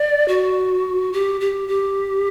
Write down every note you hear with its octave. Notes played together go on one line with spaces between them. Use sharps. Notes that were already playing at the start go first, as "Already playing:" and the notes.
Already playing: D5
F#4
G4
G4
G4